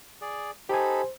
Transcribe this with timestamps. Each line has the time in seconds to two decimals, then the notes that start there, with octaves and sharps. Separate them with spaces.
0.22 G#4 D5
0.69 D#4 G4 A4 C5 G#5 B5